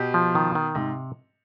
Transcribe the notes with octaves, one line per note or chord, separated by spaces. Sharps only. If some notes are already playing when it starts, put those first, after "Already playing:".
Already playing: B2 G4
F3
D#3
D#3
G#2 C3